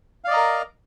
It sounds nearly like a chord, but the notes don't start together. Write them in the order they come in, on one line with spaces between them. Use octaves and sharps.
F5 D5 D#5 A#5 A#4